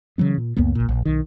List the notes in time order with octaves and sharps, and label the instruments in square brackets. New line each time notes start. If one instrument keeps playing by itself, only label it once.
[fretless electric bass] C#3 E3 F#3 B3
A#2
C#2 F#2 A#3 B3
A#1 A#2
A#1
B1 D#3